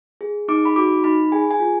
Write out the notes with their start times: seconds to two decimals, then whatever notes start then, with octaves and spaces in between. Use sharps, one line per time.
0.21 G#4
0.48 D#4 D6
0.65 B5
0.76 F#4 D6
1.04 D#4 B5
1.32 G#4 G#5
1.51 G#5
1.60 F4